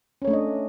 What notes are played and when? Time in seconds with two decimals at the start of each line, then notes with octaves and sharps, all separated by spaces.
0.22 C#4
0.25 C#5
0.27 A3
0.30 D4
0.33 D#5